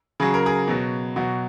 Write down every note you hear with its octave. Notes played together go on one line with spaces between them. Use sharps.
C#3 F#3 G#4
A#4
G#4
B2 F#3
B2 F#3 F#4